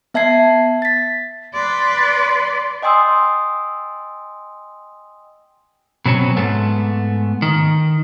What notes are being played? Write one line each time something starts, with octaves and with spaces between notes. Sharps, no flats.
B3 E5 A5 G#6 C7
A6 B6
B4 D5 C6
D#5 G5 G#5 C6 D#6 E6
B2 F#3 C4 C#4
G#2 A3 B3
D#3